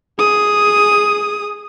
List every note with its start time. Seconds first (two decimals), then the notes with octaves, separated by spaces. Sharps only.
0.18 G#4 D#6